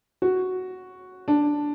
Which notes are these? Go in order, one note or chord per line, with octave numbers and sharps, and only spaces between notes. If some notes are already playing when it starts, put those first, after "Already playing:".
F#4
D4